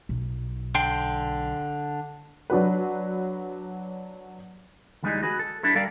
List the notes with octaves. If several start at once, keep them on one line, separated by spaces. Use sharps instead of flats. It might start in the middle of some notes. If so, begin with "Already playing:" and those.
B1
D3 G5 C6
F#3 D4 F#4 B4
D2 E3 G3 G#3 B3 D#4
F#4 G#4 B4
A4
G3 D4 E4 A4
G3 A4 A#4 D5 F5